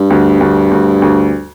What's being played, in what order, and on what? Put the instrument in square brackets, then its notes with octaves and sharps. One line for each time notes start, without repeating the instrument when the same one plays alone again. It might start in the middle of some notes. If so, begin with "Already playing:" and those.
Already playing: [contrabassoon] G2
[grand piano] D2
D2
D2
D2